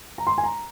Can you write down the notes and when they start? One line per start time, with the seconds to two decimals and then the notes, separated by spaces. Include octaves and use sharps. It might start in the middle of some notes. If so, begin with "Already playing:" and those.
0.18 A#5
0.27 C6
0.38 G#5
0.44 A#5